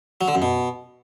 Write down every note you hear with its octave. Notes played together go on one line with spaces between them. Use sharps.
F#3
D3
F#2
B2